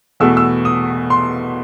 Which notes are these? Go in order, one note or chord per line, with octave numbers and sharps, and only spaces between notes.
E2 B2 A3 E6
E6
D#6
C6